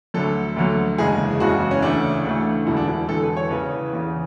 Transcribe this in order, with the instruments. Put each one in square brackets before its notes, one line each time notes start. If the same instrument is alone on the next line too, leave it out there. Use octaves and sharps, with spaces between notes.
[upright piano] D2 D3 F#3 A4
D2 D3 F#3
F#1 E2 C#3 G#3 G#4
F#1 E2 C#3 G#3 F#4
C#4
D2 C#3 E3 A3 D4
D2 C#3 E3 A3
E1 E2 D3 E4
D4
E4
E1 E2 D3 A4
B4
C#5
E2 C#3 E3 B4
E2 C#3 E3